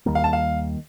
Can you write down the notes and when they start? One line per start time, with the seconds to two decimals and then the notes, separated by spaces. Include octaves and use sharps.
0.06 D#2 D#3 G3 A#3
0.15 F5
0.24 A5
0.33 F5